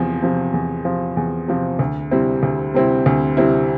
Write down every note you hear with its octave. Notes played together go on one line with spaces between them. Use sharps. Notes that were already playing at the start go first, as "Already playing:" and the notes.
Already playing: E2 C3 F3
C3 F3
E2
C3 F3
E2
C3 F3
D2
C3 G3 C4 E4
D2
C3 G3 C4 E4
D2
C3 G3 C4 E4